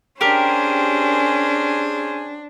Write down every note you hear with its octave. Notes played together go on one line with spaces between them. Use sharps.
C#4 D4 G4 G#4 A#4 C5 G#5